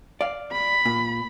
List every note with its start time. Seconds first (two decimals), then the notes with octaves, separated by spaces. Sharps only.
0.21 D5 F5
0.52 B5
0.85 A#2